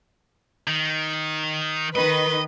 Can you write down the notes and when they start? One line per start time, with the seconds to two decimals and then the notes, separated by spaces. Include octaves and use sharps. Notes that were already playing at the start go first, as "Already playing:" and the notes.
0.67 D#3
1.95 D#3 B4 D#5